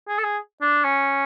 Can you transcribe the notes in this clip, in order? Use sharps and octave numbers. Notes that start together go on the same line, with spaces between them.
G#4
A4
G#4
D4
C#4